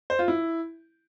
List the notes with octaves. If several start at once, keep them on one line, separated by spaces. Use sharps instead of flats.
C5
F4
E4